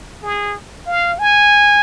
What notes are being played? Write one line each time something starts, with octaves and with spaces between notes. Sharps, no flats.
G#4
F5
G#5